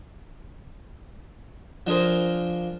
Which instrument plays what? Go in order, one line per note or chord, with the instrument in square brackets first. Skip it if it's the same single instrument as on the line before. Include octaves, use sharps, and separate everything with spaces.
[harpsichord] F3 D4 G#4 A#4 C5